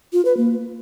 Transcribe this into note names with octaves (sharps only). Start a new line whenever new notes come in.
F4
B4
A#3